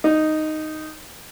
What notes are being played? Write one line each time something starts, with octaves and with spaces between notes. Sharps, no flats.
D#4